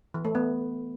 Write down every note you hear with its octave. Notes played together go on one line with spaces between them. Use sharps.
E3
A3
B3